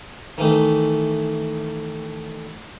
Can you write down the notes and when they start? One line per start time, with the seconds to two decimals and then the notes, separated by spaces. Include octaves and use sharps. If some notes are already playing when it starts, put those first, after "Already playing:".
0.38 D#3 E3 A3